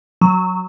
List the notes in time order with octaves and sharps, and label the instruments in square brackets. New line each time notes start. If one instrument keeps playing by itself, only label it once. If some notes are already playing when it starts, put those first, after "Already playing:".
[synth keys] F#3